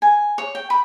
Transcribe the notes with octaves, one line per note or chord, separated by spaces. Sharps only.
G#5
C#5
G5
B5